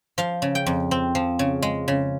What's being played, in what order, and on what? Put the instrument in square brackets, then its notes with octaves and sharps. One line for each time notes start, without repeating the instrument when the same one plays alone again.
[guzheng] F3 F5
C#3
G5
F2
C4
F3
C#3
G#3
C#3